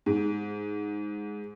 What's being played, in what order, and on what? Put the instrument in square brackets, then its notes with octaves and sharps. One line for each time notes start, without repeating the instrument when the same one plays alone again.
[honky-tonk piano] G#2